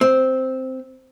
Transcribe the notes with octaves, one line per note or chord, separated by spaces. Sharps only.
C4